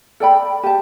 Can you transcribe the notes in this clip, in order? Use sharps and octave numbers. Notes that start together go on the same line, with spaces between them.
A4 D5 G5 B5
G4 A5